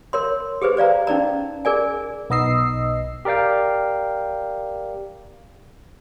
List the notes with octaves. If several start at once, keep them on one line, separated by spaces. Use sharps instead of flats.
A#4 C#5 C6
G4 G#4 B4 C5
C5 D5 F5 A#5
C#4 D#4 D5 A#5
G#4 A#4 D5 G#5
B1 B3 D#4 D#5 E6 C7
G4 A#4 D5 F5 G5